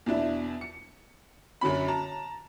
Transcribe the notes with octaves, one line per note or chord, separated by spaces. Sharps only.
E2 B2 D4 E4
C#7
F#2 D3 F#3 C#4 B5
A5 A#5